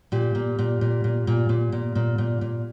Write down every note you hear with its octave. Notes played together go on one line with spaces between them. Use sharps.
A#2 G4
A#2
A#2
A#2
A#2
A#2
A#2
A#2
A#2
A#2
A#2